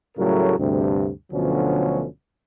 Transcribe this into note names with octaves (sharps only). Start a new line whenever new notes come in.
A2 C#3 F#3 G3 A3 A#4
D2 G2 C3
D2 B2 D3 F3 F#3 C#4